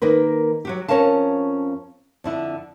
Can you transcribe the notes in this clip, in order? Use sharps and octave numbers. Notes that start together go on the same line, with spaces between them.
D#3 A#3 A#4 B4
F#3 F#4 G4
F2 A3 C#4 A#4 F5 A5
F2 D3 E4